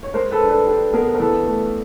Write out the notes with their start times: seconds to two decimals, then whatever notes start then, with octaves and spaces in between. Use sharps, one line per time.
0.03 C#5
0.14 G#3 A#4 C5
0.31 A4 B4
0.41 D4
0.49 A4 B4
0.67 D4 G4 A4
0.94 B3 G#4 A#4
1.15 A#4
1.19 E3 A4 B4
1.46 A3